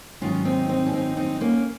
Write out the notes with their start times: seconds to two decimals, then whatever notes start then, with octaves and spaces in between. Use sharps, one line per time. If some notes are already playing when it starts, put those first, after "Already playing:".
0.21 G#2 D#3 F#3 C#4 F4
0.45 C4 D#4
0.69 C4 D#4
0.86 C#4
0.93 C4 D#4
1.17 C4 D#4
1.41 A#3 C#4